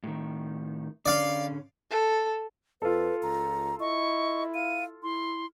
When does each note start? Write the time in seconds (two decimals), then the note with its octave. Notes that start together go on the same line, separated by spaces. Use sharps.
0.04 A2 D#3
1.06 D3 C#4 D5 F5
1.90 A4
2.82 F2 F4 A4 B4
3.23 C#2 A#5
3.80 E4 D#5 C#6
4.54 F5 D#7
5.03 E4 C6